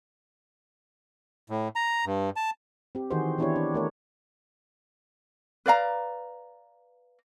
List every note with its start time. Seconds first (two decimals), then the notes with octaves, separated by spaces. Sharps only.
1.50 A2
1.76 A#5
2.06 G2
2.36 A5
2.95 C4 G4
3.10 D#3 E3 F#4 G#4 C5 D#5
3.38 E3 B3 D4 E4 G4 C#5
3.56 D4
3.74 A3 A#4 C#5
5.66 B4 D5 F5 A#5